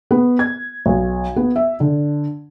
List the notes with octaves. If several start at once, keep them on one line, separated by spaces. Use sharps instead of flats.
B3
G#6
B1
B3
E5
D3